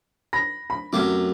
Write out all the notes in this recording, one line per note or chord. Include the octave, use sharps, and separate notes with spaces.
B5 A#6
B5
F#2 C3 A3 D6